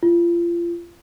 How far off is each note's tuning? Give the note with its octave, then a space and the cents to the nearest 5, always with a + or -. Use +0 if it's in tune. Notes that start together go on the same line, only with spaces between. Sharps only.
F4 -30